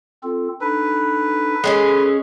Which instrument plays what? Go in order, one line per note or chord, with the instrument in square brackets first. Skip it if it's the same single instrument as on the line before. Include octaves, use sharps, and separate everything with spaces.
[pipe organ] C4 F4 A4
[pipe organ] D4 D#4 A4 [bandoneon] B4
[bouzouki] G#3 C4 C#4 [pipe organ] A4